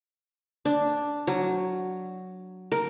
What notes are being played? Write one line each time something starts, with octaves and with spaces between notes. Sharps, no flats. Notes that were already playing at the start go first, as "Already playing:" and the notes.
D4
F#3
A#4